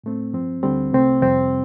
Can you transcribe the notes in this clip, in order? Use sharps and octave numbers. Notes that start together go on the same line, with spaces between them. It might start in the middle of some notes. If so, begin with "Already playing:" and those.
A2 A3 C4
G2 F3 C4
D2 D3 G3 C4
C2 C3 A3 C4
F2 C3 G3 C4